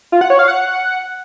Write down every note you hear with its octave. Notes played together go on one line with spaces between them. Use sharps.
F4
F#5
C#5
F5
F#5